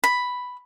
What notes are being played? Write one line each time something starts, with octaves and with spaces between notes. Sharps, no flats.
B5